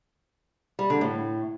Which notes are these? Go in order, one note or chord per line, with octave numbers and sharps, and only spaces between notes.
G3
D3
A2